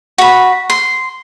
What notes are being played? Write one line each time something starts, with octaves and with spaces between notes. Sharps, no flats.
F#4 B5
C6